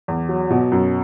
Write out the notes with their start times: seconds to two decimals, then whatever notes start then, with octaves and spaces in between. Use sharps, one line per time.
0.08 E2
0.29 F#3
0.50 B2
0.72 F#2